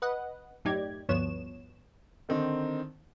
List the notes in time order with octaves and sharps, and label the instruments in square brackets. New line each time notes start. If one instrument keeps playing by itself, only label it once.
[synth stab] B4 D#5 F#5
F#2 A2 D#4 G4 D5 G#6
D2 G2 F3 B3 C#5 E7
[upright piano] D3 D#3 C4 D#4